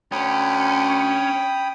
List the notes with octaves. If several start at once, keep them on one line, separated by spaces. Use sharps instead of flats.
D2 C#4 G5 B5 D#6